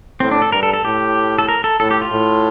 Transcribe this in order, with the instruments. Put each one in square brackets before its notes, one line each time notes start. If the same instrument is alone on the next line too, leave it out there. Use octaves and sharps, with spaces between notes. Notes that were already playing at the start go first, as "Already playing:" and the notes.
[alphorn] A2 [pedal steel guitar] C4
[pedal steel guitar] D4
A4
[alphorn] G2 [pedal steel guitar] A#4
[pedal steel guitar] A4
A4
[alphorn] A2 [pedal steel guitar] G4
[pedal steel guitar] A4
A#4
A4
[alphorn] A2 [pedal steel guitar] A4
[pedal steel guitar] G4
F4
[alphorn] A2